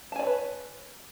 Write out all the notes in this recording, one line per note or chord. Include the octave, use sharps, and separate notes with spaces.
B4 C#5 D5 G#5 A5